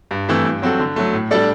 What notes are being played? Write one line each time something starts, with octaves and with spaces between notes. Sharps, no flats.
G2
E3 A3 C4 E4
G2
F#3 C4 F#4 A4
D3
F#3 A3
A2
G3 D4 A4 D5